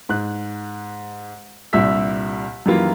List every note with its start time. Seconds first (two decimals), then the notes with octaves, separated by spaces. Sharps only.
0.09 G#2 F#6
1.73 C2 G2 A#2 E5 E6 B6
2.66 F#2 D#3 E3 G3 A#3 F4